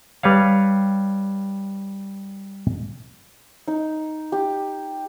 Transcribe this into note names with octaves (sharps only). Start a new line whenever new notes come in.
G3 B4 C#5 F5
D#4
G4